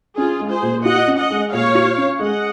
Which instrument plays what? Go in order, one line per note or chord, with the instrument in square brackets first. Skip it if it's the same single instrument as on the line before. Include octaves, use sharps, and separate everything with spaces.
[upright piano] C#4 [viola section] F4 G#4
[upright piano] G#3
[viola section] G#4 C5
[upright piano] A#2
[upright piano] F4 [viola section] D#5 F#5
[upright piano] C#4
[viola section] D#5 F#5
[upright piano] G#3
[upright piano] A#2 [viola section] C#5 F5
[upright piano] F4
C#4
[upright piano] G#3 [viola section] D#5 F#5